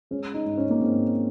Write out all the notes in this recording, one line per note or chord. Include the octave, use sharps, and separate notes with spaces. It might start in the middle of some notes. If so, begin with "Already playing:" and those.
G#3 C#4
D#4
G#2
C#4
A#3
G#2 C4